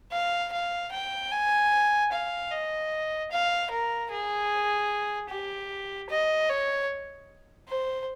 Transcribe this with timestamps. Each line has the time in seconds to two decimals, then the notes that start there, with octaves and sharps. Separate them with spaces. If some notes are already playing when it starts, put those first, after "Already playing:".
0.12 F5
0.53 F5
0.92 G5
1.31 G#5
2.12 F5
2.51 D#5
3.31 F5
3.70 A#4
4.10 G#4
5.29 G4
6.10 D#5
6.49 C#5
7.68 C5